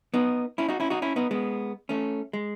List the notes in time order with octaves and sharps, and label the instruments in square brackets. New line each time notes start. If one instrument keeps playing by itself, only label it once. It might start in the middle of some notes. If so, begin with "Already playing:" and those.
[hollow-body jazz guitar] B3 D#4
C#4 E4
D#4 F#4
C#4 E4
D#4 F#4
C#4 E4
B3 D#4
G#3 B3
A3 C#4
G#3